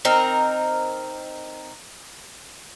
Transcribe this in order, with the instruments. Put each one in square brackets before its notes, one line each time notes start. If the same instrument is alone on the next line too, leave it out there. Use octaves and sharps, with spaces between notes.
[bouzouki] C4 D#4 A#4